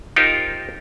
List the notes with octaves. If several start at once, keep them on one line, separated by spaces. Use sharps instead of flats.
D#4 F4 G4 A#4 C5